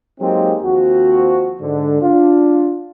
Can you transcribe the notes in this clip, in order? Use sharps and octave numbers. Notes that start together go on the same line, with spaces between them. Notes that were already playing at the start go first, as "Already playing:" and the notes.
F#3 G#3 A#3 C4 D#4 G4
D#2 F3 C4 F#4
G#2 D3
D4 F4